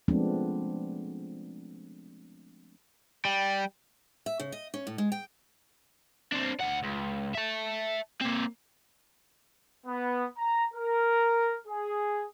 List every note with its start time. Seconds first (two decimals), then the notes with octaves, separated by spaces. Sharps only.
0.08 F3 G#3 A3 B3 C4 D4
3.25 G3
4.26 E5
4.40 C#3
4.52 D#5
4.74 C#4
4.87 A2
4.98 G#3
5.12 G5
6.33 C4 D4
6.61 D2 F#5
6.84 C#2
7.35 E5 A5
8.21 A#3 C4
9.87 B3
10.38 A#5
10.74 A#4
11.67 G#4